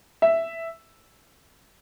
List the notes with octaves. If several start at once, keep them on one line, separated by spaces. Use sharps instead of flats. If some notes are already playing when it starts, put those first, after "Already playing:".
E5